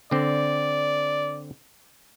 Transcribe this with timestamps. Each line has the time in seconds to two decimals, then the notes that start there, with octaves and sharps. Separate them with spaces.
0.11 D3 C4 D5